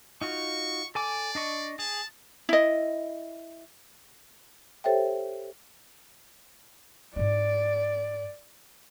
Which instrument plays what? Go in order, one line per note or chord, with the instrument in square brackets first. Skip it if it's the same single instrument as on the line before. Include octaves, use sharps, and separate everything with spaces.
[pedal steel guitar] D#4 F4 F#4 [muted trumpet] C#6
[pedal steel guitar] A4 G#5 D6 [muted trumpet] D5
[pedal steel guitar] D4 D#5 C#6
[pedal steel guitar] G#4 [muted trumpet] A5
[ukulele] E4 D#5
[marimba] G4 A4 C5 C#5 E5 G5
[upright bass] G#2 D#4 [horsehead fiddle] D5